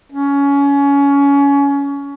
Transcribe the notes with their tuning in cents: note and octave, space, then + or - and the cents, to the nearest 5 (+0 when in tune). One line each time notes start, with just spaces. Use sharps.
C#4 +25